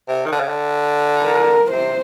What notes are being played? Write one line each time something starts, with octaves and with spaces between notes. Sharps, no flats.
C3
D#3
D3
C#3
D3
A#4
C3 C5